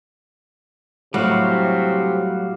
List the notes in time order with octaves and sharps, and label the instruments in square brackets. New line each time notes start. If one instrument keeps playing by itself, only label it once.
[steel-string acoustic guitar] A2 [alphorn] C3 [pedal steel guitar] F#3 G3 [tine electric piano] F#4 F5